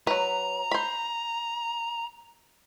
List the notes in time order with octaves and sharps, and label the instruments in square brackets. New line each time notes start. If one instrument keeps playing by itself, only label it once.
[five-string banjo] F#3 B4 [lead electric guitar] A#5
[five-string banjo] C5 B5